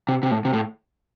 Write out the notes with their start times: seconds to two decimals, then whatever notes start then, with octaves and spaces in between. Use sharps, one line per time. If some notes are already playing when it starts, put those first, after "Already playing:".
0.09 C3
0.23 C3
0.31 A2
0.45 C3
0.53 A2